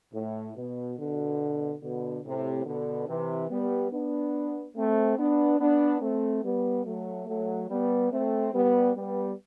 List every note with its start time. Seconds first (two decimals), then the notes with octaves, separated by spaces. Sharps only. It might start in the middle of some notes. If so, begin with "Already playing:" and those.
0.14 A2
0.57 B2
0.98 B2 D3
1.81 B2 D3
2.24 A2 C3
2.66 B2 D3
3.08 C3 E3
3.50 G3 B3
3.92 B3 D4
4.76 A3 C4
5.17 B3 D4
5.60 B3 D4
6.01 A3 C4
6.43 G3 B3
6.86 F#3 A3
7.27 F#3 A3
7.69 G3 B3
8.12 A3 C4
8.53 G3 B3
8.95 G3 B3